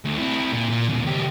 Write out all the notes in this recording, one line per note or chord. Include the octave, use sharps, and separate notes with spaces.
D2
C4 E4
A#2
A#2
D#2 B2
C#2 G4